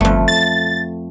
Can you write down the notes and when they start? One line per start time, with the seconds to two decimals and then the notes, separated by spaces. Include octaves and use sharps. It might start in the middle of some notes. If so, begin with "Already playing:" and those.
0.01 G1 F2 A3
0.28 A6